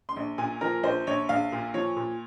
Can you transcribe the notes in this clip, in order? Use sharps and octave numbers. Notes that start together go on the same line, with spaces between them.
C6
A#1
A#2 G#5
F3 A#4
A#1 C5
A#1 C#5
A#1 F5
A#2
F3 C#5
A#2